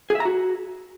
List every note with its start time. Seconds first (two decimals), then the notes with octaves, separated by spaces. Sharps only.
0.10 G#4
0.15 E5
0.20 A#5
0.25 F#4